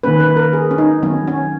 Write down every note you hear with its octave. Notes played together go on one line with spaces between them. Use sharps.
D#3 A#3 C#4 B4
B4
A#4
G#4
C#4
D#4
D#3 F#3 B3 C#4
C#4